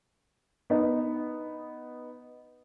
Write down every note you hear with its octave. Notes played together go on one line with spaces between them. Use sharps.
B3 D#4